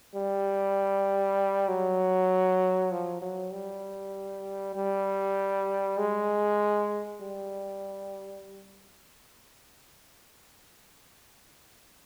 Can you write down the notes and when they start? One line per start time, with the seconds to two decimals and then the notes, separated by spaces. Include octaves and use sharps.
0.15 G3
1.68 F#3
2.91 F3
3.22 F#3
3.52 G3
4.76 G3
5.98 G#3
7.21 G3